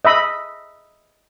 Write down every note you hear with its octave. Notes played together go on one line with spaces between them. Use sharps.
D#5 E5 B5